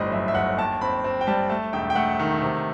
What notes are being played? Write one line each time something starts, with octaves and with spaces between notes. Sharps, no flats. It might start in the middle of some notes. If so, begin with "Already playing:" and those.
Already playing: G1 A2 G3 C5 D#5
F#2 E5
E5
G1 F#5
D#2 A5
C4 B5
C4
G5
G3 A5
A3 A5
E1 G5
G5
A3 F#5
D#3
C3